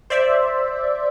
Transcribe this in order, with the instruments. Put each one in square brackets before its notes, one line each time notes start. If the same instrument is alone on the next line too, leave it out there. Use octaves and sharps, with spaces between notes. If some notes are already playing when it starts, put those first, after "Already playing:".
[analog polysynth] C5 D5 E5